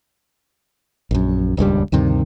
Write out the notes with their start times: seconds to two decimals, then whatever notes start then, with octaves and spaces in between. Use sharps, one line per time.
1.11 A#1 F#2
1.57 D#1 C#2 G2 G3
1.92 D2 G2 C3 D#3